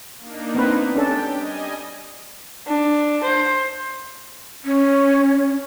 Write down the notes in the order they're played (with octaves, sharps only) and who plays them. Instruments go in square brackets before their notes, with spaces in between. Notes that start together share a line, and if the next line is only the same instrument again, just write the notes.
[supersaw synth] A#3 D4 D#4
[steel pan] B3 C4 B4
[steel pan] C#4 D4 A4 [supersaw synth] G4 G5
[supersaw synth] G3 D#5 G#5
[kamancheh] D4
C5
[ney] C#4